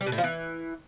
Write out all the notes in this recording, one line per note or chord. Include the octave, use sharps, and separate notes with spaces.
G3
B2
A2
F3
E3